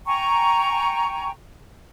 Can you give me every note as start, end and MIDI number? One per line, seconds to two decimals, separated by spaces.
0.06 1.30 79
0.06 1.30 80
0.06 1.30 82
0.06 1.30 85